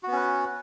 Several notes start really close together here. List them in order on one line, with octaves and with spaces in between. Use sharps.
F#4 B3 C#4 B4